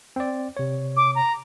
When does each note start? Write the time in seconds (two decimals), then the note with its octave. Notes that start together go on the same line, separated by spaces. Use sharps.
0.16 C4 D5
0.57 C3 C#5
0.97 D6
1.15 A#5